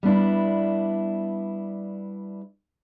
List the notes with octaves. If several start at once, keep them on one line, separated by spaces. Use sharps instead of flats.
G3 B3 D4 E4